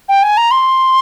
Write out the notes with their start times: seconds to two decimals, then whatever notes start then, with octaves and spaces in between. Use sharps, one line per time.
0.09 G5
0.23 G#5
0.37 A#5
0.51 C6